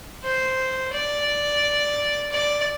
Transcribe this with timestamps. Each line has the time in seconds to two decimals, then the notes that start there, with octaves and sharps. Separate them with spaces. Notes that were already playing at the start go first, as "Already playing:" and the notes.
0.24 C5
0.93 D5
2.32 D5